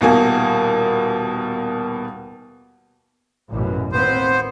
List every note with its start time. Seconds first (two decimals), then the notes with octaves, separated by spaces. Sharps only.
0.01 D#1 B2 A#3 G#5
3.51 A1 F#2 B2
3.93 D#2 B3 C4 C5